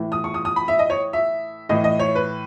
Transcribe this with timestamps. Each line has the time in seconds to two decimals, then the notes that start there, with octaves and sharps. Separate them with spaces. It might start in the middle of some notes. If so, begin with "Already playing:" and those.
Already playing: A2 E3
0.12 D#6
0.24 C#6
0.34 D#6
0.45 D#6
0.56 B5
0.68 E5
0.79 D#5
0.90 C#5
1.13 E5
1.69 A2 E3 D#5
1.84 D#5
1.99 C#5
2.15 B4